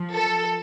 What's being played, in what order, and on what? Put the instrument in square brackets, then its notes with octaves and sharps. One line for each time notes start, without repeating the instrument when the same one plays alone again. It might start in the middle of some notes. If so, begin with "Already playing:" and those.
Already playing: [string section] F3
A4